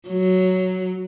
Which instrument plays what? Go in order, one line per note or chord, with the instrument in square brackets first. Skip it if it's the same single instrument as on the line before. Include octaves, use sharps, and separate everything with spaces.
[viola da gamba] F#3